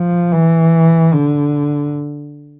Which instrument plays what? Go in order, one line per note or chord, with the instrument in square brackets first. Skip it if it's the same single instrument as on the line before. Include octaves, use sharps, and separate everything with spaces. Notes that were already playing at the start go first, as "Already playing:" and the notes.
Already playing: [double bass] F3
E3
D3